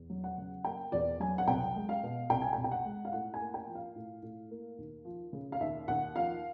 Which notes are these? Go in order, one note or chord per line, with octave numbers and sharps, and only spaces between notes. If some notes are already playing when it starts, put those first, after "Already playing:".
Already playing: E2
F#3
F#5
C#3
A#3 G5
E2 D5
F#3 G#5
F#5
C2 G5
G#3
F5
B2
C2 G5
G#5
G5
C2
G5
F#5
G#3
F5
A2 F#5
G#5
A#3
G5
F3
F5
A2
A2
A#3
D#2
F3
C#3
F5
D#2 E5
D#2 F#5
F3 F5